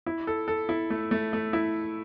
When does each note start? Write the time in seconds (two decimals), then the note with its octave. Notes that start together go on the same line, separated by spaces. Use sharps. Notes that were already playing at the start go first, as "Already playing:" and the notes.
0.06 E4
0.27 A4
0.48 A4
0.69 E4
0.90 A3
1.11 A3
1.33 A3
1.53 E4